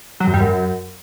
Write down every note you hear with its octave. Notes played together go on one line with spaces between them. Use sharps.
F#3
F#2
G3
F#2